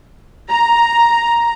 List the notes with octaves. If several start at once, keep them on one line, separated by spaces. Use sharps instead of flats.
A#5